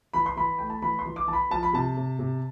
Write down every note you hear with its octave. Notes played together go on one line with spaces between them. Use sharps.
E3 B5
C6
E3 B5
A3 G5
A5
E3 B5
C6
E3
D6
E3 A5
B5
F3 A5
B5
C3 A5
C3
C3